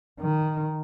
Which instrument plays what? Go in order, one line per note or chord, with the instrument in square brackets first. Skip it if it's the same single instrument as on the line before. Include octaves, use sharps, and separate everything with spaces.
[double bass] D#3